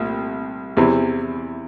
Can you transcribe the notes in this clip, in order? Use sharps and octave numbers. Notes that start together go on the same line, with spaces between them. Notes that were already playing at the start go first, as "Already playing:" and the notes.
Already playing: C2 A#2 A3
E2 C3 E3